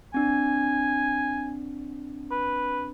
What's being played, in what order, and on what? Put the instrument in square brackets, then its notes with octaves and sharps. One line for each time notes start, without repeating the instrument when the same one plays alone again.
[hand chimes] C4 D4 [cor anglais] G#5
[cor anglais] B4